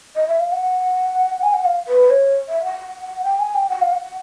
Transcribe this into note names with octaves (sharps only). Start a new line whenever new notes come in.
D#5
E5
F5
F#5
G#5
F#5
F5
B4
C#5
E5
F#5
G5
G#5
G5
F#5
F5
F#5